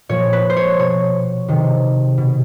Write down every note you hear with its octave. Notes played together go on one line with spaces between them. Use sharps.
A#2 F3 C#5
B4
C5
C#5
B2 C#5
C3 D#3
B2